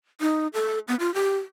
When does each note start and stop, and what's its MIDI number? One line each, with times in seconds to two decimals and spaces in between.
0.21 0.47 63
0.54 0.79 69
0.88 0.95 59
1.00 1.13 65
1.14 1.37 67